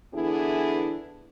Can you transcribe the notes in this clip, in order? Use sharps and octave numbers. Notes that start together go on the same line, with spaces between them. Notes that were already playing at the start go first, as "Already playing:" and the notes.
D3 E3 B3 D4 E4 G#4